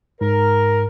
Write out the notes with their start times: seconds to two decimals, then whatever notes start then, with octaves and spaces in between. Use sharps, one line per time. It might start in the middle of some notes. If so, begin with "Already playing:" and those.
0.21 G#2 A#4